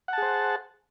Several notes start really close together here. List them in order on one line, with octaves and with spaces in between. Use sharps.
F#5 A5 G#4 C5